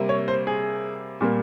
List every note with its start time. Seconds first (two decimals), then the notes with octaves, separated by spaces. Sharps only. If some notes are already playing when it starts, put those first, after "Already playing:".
Already playing: C3 G3 A#3
0.09 C#5
0.28 C5
0.47 G#4
1.21 A#2 G3 A#3